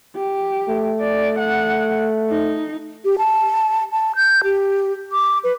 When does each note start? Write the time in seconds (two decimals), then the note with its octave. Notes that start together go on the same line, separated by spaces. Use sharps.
0.16 G4
0.69 A3
1.00 D5
1.39 F#5
2.30 D#4
3.05 G4
3.18 A5
3.92 A5
4.16 G6
4.44 G4
5.12 D6
5.44 B4